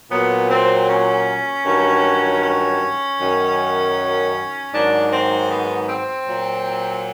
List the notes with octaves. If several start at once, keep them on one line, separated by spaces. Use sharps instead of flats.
A#2 F#3 B3
C4
C#4
G2 D#3 F#3
C#4
F#2 D#3 F#3
G#2 D#3 F#3 D4
C4
B3
C4
A#2 F#3